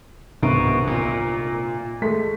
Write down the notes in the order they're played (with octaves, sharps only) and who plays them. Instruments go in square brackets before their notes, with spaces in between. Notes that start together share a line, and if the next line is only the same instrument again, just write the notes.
[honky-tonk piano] C2 G#2 D3 [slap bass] B2
[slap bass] A#2
[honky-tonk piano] G#3 A3 B6